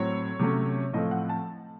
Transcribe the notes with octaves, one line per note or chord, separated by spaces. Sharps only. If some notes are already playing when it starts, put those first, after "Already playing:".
Already playing: A2 F#3 C4 C#5
C3 F#3 A3 C#4
A2 F3 A3 C4 D#5
F#5
A5